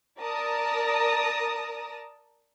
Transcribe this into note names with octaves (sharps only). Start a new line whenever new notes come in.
A#4 D5 A5 A#5 D#6 A#6